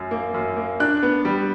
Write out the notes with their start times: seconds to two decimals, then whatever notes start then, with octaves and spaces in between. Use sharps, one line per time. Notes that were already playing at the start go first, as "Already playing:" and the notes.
Already playing: F#2
0.11 A#3
0.34 F#2
0.56 A#3
0.80 D4 F#6
1.03 B3
1.25 G3